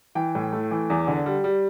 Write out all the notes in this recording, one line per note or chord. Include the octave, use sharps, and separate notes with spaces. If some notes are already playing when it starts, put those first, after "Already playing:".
E3 G5
A2
A3
E3
E2
D3
G3
G3